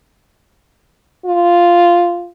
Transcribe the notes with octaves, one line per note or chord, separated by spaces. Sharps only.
F4